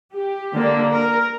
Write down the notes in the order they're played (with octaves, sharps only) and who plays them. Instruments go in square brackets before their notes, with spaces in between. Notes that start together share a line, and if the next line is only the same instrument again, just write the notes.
[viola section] G4
D3 A#3 D4
A#4